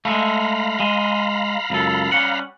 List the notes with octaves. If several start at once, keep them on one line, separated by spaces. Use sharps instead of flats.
G#3 A3 F5 A#5 B5
G#3
C#2 F#2 A4
G3 C#4 F#5